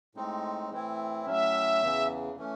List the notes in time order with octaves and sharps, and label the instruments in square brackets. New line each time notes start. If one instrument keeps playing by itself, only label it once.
[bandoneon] A2 G#3 C4 D#4
A2 E3 C4 E4
[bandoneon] A2 F#3 C#4 [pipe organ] E5
[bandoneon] E2 C#3 E3
E3 A3 C#4